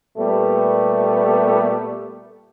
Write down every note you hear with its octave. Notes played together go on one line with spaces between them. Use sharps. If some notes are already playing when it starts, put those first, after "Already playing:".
A#2 G3 A3 B3